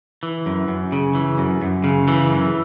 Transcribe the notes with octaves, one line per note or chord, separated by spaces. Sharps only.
E3
F#2
F#2
C#3
E3
F#2
F#2
C#3
E3
F#2